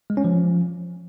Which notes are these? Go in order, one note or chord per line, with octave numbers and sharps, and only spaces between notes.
G#3
C#4
F3